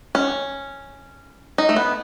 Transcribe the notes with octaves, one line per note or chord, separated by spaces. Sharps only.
C#4
D#4
A3
B3